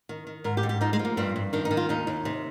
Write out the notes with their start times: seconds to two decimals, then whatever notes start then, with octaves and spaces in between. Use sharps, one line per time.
0.09 D#3
0.27 D#3
0.44 G#2 A#4
0.57 G4
0.63 G#2
0.69 G4
0.81 F3 D#4
0.93 G#3
0.99 F3
1.05 A#3
1.17 G2 C4
1.36 G2
1.53 D#3 D4
1.65 D#4
1.71 D#3
1.77 F4
1.89 D#2 D#4
2.07 D#2
2.25 C3